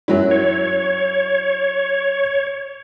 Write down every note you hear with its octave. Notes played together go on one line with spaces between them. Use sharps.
F#2 F#3 E4
C#5